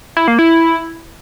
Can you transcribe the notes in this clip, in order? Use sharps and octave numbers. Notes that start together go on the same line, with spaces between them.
E4
A#3
E4